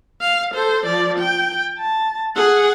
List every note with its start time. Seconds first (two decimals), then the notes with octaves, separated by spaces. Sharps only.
0.21 F5
0.54 A4 C5
0.86 F3 D5
1.19 G5
1.79 A5
2.36 G#4 F#5